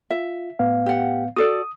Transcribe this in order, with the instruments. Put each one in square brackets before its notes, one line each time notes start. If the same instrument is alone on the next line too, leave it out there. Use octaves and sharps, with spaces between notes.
[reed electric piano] F4 [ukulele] E5
[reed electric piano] A2 B3 F5
[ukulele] G4 F#5
[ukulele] F#4 A4 D5 [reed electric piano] D#6